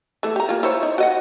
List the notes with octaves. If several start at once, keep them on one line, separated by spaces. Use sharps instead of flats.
E3 A3
G4 A#5
A#3 F4
E4 C5 C#5
D#4
F#4 D#5 F#5